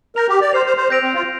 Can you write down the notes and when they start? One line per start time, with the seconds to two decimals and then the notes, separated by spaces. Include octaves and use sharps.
0.16 A#4 G6 A#6 F7
0.29 G4
0.41 D5
0.53 C5 F6 C7 F7
0.66 C5
0.77 C5
0.90 C4 G6 A#6 D7 F7
1.03 C4
1.14 F4